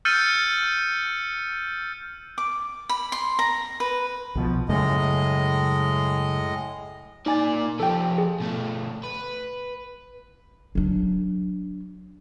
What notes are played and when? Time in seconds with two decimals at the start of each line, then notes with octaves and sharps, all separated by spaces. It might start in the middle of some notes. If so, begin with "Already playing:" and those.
0.05 E6 F6 G6 A6 C#7 D#7
2.38 D6
2.89 B5
3.12 C6
3.39 A#5
3.80 B4
4.35 B1 B2 F3
4.69 F#2 A2 C#3 G#3 A3 D#5
7.26 A#3 D#4 D5 G#5 A6
7.80 F3 G4 A4 G5
8.18 G#4
8.40 B2 A3
9.04 B4
10.75 F#3 D4